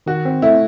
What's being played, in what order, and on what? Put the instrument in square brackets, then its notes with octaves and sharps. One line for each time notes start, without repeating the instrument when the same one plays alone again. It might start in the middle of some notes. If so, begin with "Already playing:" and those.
[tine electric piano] D#3 [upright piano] F#4
[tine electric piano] C4
[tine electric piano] A3 [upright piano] E4